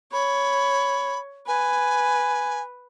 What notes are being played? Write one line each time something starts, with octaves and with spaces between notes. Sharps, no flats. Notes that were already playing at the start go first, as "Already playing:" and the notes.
C#5 B5
B4 G#5